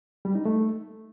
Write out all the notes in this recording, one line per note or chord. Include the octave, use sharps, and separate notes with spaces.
G3
D#4
A3